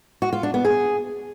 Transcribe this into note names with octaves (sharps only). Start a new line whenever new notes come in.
F#4
F4
D4
B3
G#4